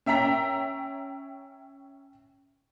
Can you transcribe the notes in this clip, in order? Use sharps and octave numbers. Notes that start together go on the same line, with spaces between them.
C#4 E5 G5 A#5 B6